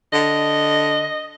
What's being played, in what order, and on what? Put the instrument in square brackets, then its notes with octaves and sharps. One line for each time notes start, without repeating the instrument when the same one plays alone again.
[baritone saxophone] D3 [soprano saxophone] D#5